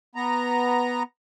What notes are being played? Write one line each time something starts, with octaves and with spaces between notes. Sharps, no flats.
B3 A#5